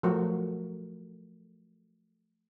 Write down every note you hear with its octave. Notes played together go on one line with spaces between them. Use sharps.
F3 F#3 A3 F#4 A#4